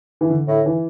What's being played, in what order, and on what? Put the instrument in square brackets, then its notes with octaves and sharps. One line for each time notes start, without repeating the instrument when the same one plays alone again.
[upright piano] E3
D3
[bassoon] A2
[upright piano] E3